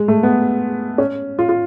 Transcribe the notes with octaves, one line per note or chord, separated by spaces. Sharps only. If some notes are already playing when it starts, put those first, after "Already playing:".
Already playing: G#3
A3
B3
C#4
F4
F4